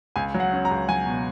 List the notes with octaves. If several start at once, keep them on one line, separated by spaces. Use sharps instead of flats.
C#2 G#5
F#3
F#5
C#4
A#5
C#2
F#3 G#5
B2